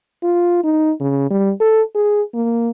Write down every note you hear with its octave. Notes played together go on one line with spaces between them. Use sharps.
F4
D#4
C#3
G3
A4
G#4
A#3